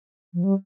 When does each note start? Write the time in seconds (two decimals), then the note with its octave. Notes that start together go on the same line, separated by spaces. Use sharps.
0.33 F3
0.43 G3